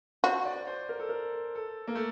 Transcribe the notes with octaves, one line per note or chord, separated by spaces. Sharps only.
F#4 C5
D5
C5
A#4
A4
A#4
A4
A#3
A3